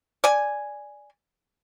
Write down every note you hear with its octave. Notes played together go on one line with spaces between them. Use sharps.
D5 G#5